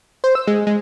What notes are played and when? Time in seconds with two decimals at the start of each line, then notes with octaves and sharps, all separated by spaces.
0.24 C5
0.35 E6
0.47 G#3
0.67 G#3